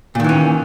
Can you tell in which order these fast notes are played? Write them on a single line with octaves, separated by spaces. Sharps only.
A#2 D#3 E3 C#4